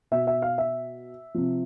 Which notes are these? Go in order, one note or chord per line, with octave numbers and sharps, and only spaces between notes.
B2 E5
E5
F5
E5
C3 F3